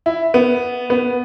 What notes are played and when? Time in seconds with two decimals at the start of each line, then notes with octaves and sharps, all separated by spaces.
0.06 E4
0.34 B3
0.90 B3